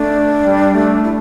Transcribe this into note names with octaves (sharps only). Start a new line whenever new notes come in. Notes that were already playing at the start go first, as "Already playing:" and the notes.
Already playing: A3 D4
G3
A3
E4